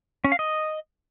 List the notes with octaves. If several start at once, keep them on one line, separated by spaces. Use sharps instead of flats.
C#4
F5
D#5